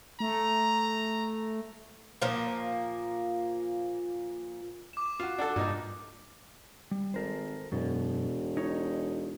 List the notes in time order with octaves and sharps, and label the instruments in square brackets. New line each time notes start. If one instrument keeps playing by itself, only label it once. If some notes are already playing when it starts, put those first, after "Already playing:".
[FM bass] A3 [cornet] A#5
[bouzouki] A#2 F3 A#3
[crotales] D6 E7
[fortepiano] F4 F#4
D4 F#4 A4
[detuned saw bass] G2 [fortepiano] A#2 D#4
[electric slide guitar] G3
[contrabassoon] G#1 [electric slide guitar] A4 A#4 C5
[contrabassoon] E1 [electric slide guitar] F#2 B2
[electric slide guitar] D#4 C#5